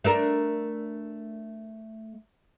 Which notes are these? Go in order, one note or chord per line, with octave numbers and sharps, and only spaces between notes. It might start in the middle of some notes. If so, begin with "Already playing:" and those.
A3 D4 A#4